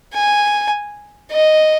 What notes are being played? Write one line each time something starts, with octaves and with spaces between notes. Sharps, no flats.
G#5
D#5